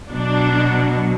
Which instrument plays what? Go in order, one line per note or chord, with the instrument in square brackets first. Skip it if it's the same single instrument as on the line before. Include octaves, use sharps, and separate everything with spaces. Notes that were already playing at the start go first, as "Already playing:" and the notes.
[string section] B2 F#3 D4